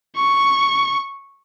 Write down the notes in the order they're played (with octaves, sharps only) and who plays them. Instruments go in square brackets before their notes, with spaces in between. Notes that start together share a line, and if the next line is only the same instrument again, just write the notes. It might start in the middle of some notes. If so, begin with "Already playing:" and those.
[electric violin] C#6